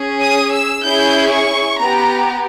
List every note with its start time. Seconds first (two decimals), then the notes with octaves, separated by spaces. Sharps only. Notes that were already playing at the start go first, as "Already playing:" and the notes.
Already playing: C#4 G#4
0.21 D#6
0.53 E6
0.84 C#4 E4 G#4 G6
1.31 C#6
1.79 B3 G4 A#5